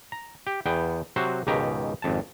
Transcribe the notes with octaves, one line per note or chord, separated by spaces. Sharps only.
A#5
G4
E2 B3 G5
C3 F#3 F#4 C5
C#2 G#2 B2 D#3 G4 A#5
G#1 F2 A5